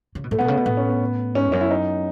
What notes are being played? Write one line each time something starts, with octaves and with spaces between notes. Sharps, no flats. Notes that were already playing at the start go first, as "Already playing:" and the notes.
C#3
B2
A2 A3
B2 B3
C#3 A3
B2
A2 B3
C#4
B3
G#2 C#4
E2
F#2 C#4
E4
D#4